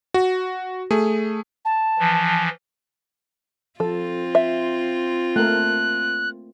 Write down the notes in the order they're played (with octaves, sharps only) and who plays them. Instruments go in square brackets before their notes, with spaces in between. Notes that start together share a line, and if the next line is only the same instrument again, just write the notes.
[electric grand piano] F#4
A3 G#4
[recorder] A5
[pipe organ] E3 F3
[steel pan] F3 [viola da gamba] C4 F4 [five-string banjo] A4
[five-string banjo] E5
[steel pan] A3 A#3 A#4 [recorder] F#6